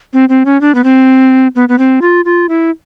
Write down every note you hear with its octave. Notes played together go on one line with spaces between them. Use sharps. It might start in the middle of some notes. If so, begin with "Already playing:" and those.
C4
C4
C#4
D4
B3
C4
B3
B3
C4
F4
F4
E4